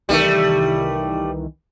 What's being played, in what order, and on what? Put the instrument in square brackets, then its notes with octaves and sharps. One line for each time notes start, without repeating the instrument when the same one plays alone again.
[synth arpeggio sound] C2 D#3 E3 [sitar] G3 A3